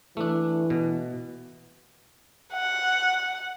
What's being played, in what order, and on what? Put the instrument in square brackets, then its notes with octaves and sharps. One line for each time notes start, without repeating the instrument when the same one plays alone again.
[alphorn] E3 [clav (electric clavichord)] A3 D4
[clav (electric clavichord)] B2
[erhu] F#5